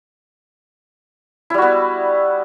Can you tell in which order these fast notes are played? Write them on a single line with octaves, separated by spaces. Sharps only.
E4 G3 F#4 B3